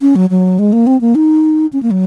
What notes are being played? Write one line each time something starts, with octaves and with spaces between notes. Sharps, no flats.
C#4
F#3
F#3
G#3
A#3
C4
A#3
D#4
C#4
A#3
F#3